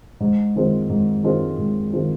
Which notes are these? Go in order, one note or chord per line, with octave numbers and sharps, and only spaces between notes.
G#2
D#3 G#3 C4 F4
G#2
D#3 G#3 C4 F4
G#2
D#3 G#3 C4 F4